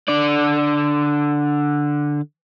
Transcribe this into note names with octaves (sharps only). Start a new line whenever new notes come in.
D3 D5